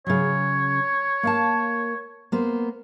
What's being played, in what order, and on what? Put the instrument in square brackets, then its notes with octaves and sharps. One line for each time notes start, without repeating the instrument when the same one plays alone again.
[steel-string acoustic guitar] C#3 F#3 [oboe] C#5
[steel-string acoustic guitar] A#3 F5 A5
A#3 B3 C5